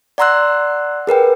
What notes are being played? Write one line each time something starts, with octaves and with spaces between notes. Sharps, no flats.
D5 F#5 A#5 C6 E6 F#6
G#4 A#4 B4 G5